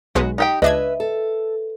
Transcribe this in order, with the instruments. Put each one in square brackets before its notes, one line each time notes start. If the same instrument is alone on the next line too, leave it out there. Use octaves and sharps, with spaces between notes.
[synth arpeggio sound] B1 G#3 B4 [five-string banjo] F#4
[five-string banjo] D#4 G4 G5
[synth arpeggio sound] C#2 D4 G#6 [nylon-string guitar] B4 E5 [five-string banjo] D#5
[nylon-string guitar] A4